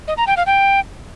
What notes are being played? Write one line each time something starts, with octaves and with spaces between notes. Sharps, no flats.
D#5
A#5
G5
F5
G5